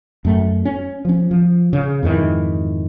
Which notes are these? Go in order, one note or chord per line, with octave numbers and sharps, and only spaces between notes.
F#2 A3
C#4
F3 C#4
F3
C#3
F2 G#2 D#3 E3